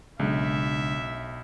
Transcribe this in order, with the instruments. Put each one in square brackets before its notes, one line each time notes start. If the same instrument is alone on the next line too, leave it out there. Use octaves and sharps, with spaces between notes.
[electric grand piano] B1 [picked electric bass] C#3 G#3 D4 [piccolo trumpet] E5